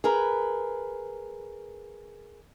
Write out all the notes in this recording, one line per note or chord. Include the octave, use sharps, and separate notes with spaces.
G#4 A#4 B4